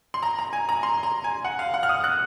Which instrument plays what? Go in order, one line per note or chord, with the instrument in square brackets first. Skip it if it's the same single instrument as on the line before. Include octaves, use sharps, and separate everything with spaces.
[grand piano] C6
A#5
A#5
G#5
A#5
C6
A#5
G#5
F#5
F5
F#5
F6
D#6
F#6